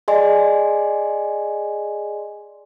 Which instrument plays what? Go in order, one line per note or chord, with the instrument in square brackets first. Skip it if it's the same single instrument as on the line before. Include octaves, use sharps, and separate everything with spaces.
[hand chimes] G#4 D5 D#5 G#5 C6